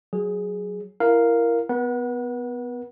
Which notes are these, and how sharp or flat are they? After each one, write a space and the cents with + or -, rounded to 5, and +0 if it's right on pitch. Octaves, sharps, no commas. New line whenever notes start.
F#3 +0 G#4 +0
E4 +25 A#4 +0 F5 +0
B3 +15 B4 -35 F#5 +0